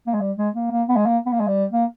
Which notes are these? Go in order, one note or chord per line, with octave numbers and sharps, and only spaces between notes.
A#3
G#3
G3
G#3
A#3
A#3
B3
G#3
A#3
B3
A#3
G#3
G3
A#3